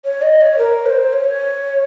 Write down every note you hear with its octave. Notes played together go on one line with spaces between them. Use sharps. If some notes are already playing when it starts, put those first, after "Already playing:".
C#5
D#5
C#5
A#4
C#5
C5
C#5